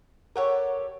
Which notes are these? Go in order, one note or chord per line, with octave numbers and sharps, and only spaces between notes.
G4 A4 A#4 C#5 F#5